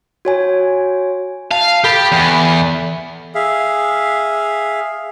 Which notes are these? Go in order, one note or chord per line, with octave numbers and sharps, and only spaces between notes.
F#4 C#5 G#5
F5 A5
G4 A4 B5 A6
E2
G#4 E5 F5